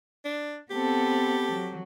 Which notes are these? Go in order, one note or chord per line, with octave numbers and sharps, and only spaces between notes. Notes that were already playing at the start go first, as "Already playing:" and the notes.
D4
B3 C4 G4 A4
F#3